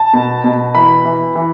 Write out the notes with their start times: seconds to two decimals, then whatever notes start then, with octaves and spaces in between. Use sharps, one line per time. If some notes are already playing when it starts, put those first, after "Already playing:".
Already playing: A5
0.13 B2
0.44 B2
0.75 E3 B5
1.05 E3
1.35 E3